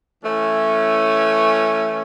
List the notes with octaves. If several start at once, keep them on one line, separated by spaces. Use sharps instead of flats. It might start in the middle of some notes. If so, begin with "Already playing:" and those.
E3 A3 C#4